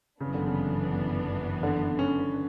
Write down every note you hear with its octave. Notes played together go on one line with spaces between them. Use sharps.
G1 F#2 C#3 E3 B3 D4
D3
C#3
D3
C#4